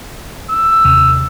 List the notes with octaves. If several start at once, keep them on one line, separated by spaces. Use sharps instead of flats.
E6
D#2 C3